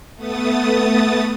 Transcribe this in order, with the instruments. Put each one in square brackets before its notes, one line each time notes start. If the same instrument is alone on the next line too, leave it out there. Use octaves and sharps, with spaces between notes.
[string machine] A3 B3 D#6 A6